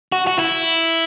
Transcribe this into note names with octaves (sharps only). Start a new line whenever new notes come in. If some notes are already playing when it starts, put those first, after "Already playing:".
F#4
F#4
E4